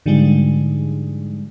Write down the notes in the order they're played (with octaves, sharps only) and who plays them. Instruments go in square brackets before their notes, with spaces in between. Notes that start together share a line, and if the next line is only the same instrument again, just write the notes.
[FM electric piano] G#2 D3 F3 G3 G#3 D#4